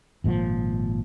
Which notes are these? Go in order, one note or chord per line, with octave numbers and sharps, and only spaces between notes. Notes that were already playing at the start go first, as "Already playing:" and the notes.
G#1 A#2 C#3 F3